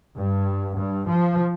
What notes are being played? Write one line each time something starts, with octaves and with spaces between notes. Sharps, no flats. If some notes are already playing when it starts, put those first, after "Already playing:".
G2
G2
F3